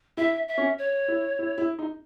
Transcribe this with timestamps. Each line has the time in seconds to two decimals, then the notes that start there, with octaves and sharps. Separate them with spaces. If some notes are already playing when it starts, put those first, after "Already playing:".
0.17 E4 E5
0.48 E5
0.58 C#4
0.78 C#5
1.08 E4
1.39 E4
1.58 E4
1.79 D#4